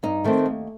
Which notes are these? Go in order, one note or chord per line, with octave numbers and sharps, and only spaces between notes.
G2 D#4
D#3 A3 C4
D#2